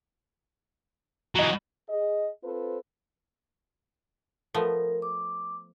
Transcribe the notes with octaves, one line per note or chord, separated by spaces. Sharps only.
E3 F#3 D#5 A#5
G#4 D#5
C4 F4 A4 B4 C5
F3 A3 B3 A#4
D6